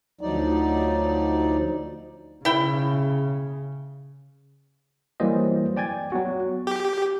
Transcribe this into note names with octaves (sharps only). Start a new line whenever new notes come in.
D2 F3 F#3 D#4 D5
C#3 E4 G5
E3 F#3 G3 A#3 C5 D#5
D5 G5 G#5 G#6 A6
F#3 B3 F#4
G4